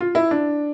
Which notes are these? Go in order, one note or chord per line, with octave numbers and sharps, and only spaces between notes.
F4
E4
D4